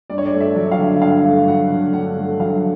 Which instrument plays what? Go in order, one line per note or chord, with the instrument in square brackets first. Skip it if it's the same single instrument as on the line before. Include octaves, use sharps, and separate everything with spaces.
[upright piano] G2 D5
C#5
D5
A3
E5
F#3
F5
D3
G2 F5
A3
F#3 F#5
D3
G2 F#5
A3
F#3 F5